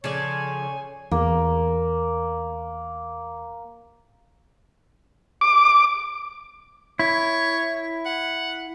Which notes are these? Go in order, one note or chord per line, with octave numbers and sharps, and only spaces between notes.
C#3 F3 A4 C#5 D5 G#5
E2 A#3
D6
E4 C#5
F#5